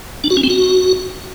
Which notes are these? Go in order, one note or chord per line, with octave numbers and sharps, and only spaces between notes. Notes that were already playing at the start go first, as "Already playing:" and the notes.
D4
F#4
C#4
C4
F#4